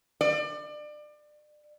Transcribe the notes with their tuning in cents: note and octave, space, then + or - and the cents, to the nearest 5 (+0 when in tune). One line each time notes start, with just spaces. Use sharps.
D5 +30